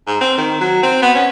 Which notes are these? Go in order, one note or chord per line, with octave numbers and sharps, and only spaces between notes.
G#2
C4
D#3
F#3
C4
B3
C#4